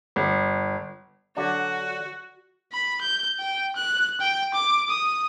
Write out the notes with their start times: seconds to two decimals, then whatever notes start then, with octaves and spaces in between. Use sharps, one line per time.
0.16 G1
1.37 D3 F#3 D4 F#4
2.72 B5
3.01 G6
3.39 G5
3.76 F#6
4.20 G5
4.54 D6
4.89 D#6